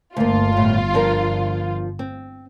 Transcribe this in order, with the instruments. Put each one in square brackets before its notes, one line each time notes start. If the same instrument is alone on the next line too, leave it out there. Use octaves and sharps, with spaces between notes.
[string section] G1 F4 [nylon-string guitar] D2 A#3
[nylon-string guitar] D#2 A2
F3 D4 A#4
C4